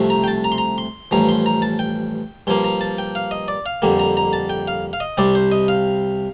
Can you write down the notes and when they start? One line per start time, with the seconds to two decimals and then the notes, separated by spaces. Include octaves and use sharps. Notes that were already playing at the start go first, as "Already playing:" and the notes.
Already playing: C2 C3 F3 A3
0.10 A#5
0.24 G5
0.28 A5
0.44 A#5
0.52 C6
0.58 A#5
0.78 C6
1.11 A1 G2 F3 A#5
1.29 C6
1.46 A#5
1.62 A5
1.79 G5
2.47 G2 F3 A#3 C6
2.64 A#5
2.81 A5
2.98 G5
3.15 F5
3.31 D#5
3.48 D5
3.66 F5
3.82 F2 D3 G3 A#3
3.99 A#5
4.17 A#5
4.33 A5
4.50 G5
4.68 F5
4.93 F5
5.00 D#5
5.17 C2 C3 G3 C4 D5
5.35 C5
5.52 D#5
5.68 F5